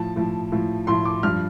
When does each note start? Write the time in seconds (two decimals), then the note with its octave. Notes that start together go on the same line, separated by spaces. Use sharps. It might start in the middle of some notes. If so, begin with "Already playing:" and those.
Already playing: A2 F3 A5
0.16 A2 F3
0.52 A2 F3
0.87 A2 F3 C6
1.05 D6
1.23 G2 F3 F6